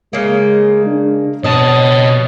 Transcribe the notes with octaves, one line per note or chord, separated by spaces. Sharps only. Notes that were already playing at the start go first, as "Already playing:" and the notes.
C#3 G#3 A#3
D4
B2 D4 C#5 D#5 A5